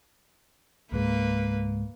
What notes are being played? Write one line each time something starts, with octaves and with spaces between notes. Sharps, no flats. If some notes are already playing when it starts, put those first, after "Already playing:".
C#2 G#2 G#3 A#3 B4